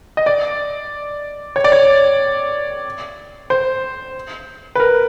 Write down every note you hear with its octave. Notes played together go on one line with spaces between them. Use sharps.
D#5
D5
C#5
D5
C#5
C5
B4
A#4